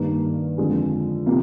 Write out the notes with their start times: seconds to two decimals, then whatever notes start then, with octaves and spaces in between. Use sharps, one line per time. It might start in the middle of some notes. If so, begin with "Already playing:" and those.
Already playing: G2 D#3 A#3
0.58 F2 D3 F3 G#3
1.26 C3 F3 A#3